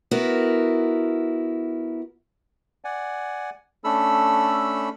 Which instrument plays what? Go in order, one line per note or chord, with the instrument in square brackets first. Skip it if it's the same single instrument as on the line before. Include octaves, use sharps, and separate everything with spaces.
[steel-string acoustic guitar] B3 E4 F#4 A#4
[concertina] D5 F#5 G#5
A3 C#4 D4 A4 B5 E6